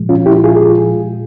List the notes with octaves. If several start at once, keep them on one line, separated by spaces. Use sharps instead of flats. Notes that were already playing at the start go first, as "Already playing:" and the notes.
Already playing: A#2 F3 G#3
C#4 F4
E4 G4
F4 G#4